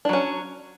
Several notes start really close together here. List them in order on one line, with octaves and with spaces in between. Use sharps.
D4 F#3 C#4